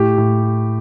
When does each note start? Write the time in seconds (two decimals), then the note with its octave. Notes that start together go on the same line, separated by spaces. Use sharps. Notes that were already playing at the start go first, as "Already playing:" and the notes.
Already playing: A2 G4
0.18 A2